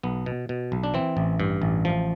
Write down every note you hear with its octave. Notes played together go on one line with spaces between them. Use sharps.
B1 B3
B2
B2
B1
D4
E3 C4
A1
G2
A1
F3